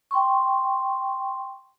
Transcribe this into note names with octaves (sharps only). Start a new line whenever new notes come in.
G5 C6 C#6